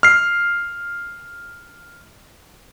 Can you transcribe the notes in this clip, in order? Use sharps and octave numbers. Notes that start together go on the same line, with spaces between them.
F6 C7